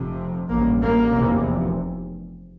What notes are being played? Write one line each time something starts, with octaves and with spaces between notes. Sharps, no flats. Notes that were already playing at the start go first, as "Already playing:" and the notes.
Already playing: F1 F2 C3
A1 G2 A#3
A#3
F1 E2 C3